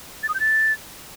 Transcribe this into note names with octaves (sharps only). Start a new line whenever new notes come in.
A6
D#6
G6
A6